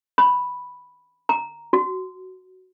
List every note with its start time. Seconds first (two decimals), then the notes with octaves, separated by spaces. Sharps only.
0.18 B5
1.29 A#5
1.73 F#4